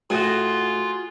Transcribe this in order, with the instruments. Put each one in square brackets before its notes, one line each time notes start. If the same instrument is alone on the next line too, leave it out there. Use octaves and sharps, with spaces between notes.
[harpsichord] A2 [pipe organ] F4 [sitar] F#4 G#4